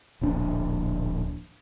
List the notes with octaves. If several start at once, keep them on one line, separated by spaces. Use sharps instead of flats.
D1 A#1 D4